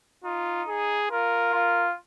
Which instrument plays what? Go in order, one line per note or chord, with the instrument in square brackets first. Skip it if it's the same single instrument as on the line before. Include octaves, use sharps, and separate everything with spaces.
[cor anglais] D#4 [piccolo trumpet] F4
[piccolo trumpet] G#4
[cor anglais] F4 [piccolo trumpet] A#4
[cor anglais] F4